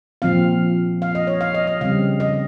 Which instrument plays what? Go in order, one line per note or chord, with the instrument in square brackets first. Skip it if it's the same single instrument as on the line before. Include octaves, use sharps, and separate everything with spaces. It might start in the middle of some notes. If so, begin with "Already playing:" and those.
[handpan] A#2 F3 C4 F5
F5
D#5
C#5
F5
D#5
D#5
C#3 G3 C4 F5
D#5